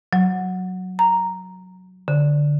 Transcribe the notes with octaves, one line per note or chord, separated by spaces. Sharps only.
F#3
A#5
D3